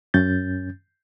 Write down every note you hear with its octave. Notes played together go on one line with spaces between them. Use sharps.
F#2 C#4 G6 A6